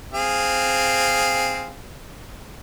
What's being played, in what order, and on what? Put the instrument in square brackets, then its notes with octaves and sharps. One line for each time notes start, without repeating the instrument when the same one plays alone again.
[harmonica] C4 G#4 F5